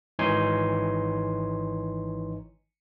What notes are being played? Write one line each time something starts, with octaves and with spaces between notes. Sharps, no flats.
G#1 E3 D#4 C#5 G#5 C6